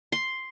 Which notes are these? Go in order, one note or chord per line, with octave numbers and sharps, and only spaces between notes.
C6